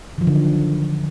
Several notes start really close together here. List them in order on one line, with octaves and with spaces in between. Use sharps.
D#3 F3 F#3 D3